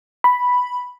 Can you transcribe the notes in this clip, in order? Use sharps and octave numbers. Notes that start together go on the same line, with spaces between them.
B5